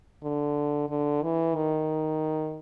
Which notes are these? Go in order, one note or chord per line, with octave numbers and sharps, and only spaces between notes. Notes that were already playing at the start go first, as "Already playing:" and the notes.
D3
D3
E3
D#3